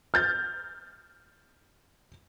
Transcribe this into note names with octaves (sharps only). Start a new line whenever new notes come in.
F6 G6 A6